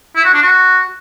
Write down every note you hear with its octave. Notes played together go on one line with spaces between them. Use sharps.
E4
F#4
D4
F#4